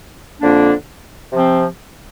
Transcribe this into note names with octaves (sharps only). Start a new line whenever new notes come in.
F2 D3 F3 A#3 D4
C3 F3 C4